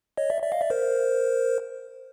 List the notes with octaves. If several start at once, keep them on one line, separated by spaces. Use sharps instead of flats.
C#5 D#5
D5 E5
D5 E5
D#5 F5
D5 E5
A#4 C5